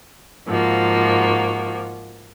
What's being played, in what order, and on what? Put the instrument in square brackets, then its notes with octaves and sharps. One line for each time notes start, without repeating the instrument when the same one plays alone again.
[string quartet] G#2 F3 A#3 F#4